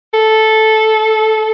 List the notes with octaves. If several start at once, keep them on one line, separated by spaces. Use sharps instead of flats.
A4